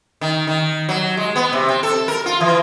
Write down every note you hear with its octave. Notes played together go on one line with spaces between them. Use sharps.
D#3
D#3
F#3
G#3
B3
C3
C4
A4
A#4
F4
E3